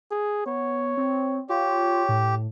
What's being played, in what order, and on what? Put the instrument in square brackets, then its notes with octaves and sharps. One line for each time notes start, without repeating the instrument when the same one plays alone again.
[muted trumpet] G#4
[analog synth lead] B3 [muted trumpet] C#5
[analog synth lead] C4
[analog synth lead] F4 [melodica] G4 [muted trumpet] C#5
[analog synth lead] A2